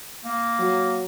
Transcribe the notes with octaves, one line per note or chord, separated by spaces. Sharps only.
A#3
F#3